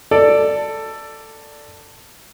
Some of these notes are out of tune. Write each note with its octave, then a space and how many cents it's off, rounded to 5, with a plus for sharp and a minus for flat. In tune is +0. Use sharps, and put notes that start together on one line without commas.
A4 +15 D5 +0